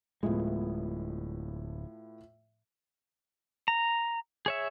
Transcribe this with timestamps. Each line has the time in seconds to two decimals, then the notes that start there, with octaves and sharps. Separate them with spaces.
0.23 D1 A2 F3 G#3 B3
3.68 A#5
4.46 G#4 C#5 E5